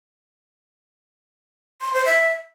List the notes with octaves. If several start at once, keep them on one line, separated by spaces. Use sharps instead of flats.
C6
C5
E5